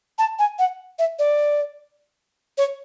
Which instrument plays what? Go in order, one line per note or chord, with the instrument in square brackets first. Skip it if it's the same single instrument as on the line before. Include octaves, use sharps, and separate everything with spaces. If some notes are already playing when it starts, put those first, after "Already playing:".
[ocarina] A5
G#5
F#5
E5
D5
C#5